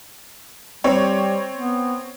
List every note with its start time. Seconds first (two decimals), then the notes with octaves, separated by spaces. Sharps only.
0.84 G3 C4 C#5
1.55 B3